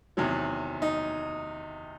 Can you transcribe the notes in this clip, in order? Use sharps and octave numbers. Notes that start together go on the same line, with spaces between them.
E2 C3 D#3 F#3
D#4